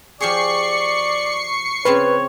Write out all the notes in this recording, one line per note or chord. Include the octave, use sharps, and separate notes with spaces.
F3 G4 G#4 D5 C#6 C7 C#7
C#3 C4 F4 B4 C#5